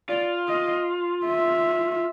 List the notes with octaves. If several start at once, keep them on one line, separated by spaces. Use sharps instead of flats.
F4 D5
D#5
E5